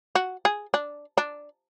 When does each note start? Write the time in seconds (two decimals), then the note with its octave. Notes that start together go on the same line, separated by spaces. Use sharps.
0.15 F#4
0.45 G#4
0.74 D4
1.18 D4